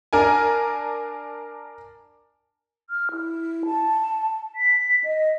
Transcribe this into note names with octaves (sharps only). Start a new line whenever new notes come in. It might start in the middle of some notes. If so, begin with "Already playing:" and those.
D4 A#4 G#5
F6
E4
A5
B6
D#5